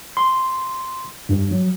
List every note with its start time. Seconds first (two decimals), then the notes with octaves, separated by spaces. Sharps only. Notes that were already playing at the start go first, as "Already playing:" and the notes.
0.17 C6
1.29 G2
1.51 F#3